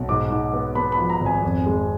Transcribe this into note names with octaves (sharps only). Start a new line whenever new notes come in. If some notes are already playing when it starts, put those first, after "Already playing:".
Already playing: B1
G#2 D6
G#2
B3
B3 B5
B5
F3
A#5
G#1
G#5
F2
G#3